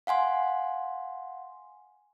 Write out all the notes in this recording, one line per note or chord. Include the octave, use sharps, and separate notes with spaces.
F5 F#5 G#5 C6